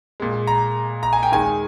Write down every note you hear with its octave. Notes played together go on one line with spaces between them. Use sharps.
A#2 G#3
A#5
A#5
G#5
G5
D#2 D#3 G#3 G#5